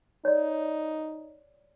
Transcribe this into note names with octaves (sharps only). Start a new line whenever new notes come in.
D#4 C#5 D5